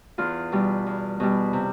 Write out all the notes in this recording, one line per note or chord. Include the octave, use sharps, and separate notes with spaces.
E2 F4
B2 G3
E2
B2 G3
C3